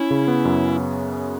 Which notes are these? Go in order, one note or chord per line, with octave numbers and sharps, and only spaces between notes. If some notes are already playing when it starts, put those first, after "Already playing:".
Already playing: C#4 E4
C#3
B3
F#2